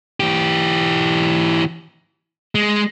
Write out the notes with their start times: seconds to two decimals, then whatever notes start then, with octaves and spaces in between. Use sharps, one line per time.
0.20 E3 G4
2.55 G#3